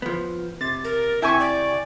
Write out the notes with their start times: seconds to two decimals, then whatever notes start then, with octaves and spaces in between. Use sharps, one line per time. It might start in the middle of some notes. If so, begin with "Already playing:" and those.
0.02 F3 B3
0.61 C3 A6
0.84 A#4
1.22 C3 E4 E5 G5 G#5 C#6
1.39 D5